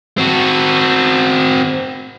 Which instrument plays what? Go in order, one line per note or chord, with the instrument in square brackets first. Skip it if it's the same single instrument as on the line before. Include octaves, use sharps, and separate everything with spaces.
[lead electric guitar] C4 F#4